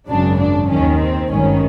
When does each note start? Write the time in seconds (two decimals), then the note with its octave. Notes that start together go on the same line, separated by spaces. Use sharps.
0.08 G#1 F#2 C#3 D4
0.39 D4
0.69 D#2 D#3 C#4
1.00 C4
1.30 G#1 G2 D#3 C#4